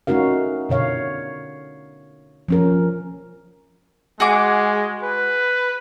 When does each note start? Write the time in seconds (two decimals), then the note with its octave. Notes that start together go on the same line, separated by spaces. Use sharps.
0.07 A3 C#4 D#4 F#4 A#4 F5
0.69 B2 D3 C#5 F5
2.48 F3 C#4 A#4
4.20 G#3 F#4 G#4 D6
5.03 B4